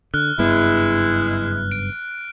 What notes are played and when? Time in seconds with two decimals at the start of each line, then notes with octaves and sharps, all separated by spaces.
0.14 D3 F6 F#6
0.38 F#1 G2 G#3 B3 E4
1.72 D7